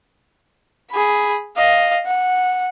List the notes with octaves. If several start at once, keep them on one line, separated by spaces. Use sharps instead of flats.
G#4 B5
D#5 F5
F#5